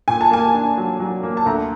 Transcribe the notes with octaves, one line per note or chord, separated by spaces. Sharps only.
A#2 G#5
A5
A#3 G#5
D4
F#3
F#3
A#3
A5
D2 A#5